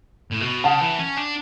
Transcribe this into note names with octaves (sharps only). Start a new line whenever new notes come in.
A2
B2
C#3 F#5 A5
E3
C#4
D4